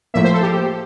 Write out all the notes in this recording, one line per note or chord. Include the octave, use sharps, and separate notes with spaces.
A2 F3 A#3 E5
C5
A4
G4